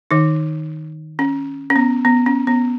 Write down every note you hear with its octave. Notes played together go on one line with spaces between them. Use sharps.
D#3 D#4
C#4
C#4
B3
B3
C#4
B3